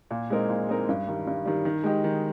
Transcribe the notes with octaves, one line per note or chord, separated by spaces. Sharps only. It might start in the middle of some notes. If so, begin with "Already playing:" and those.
A#2
G#3 C4 D#4 A#4
A#2
G#3 C4 D#4 A#4
G2
D#3 G3
G2
D#3 G3
D#3
G#3 D#4 G4
D#3